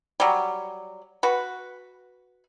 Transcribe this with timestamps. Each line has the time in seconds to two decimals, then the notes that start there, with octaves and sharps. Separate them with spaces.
0.20 F#3 G3
1.23 F#4 B4